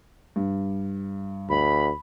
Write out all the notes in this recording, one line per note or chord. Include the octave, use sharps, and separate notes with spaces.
G2
D2 B5